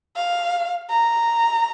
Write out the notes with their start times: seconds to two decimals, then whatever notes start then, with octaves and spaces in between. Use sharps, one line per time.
0.16 F5
0.91 A#5